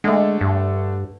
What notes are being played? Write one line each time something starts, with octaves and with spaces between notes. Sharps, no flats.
D3 G#3 A3
G2